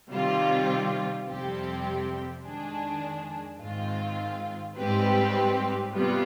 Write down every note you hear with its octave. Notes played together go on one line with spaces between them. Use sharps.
C3 D#3 G3 C4 F4
F2 C3 G3 C4 G4
F2 D#3 G#3 D4 G#4
G#2 D#3 G#3 C4 F4
G#2 G3 C4 G4 B4
C3 G3 B3 F4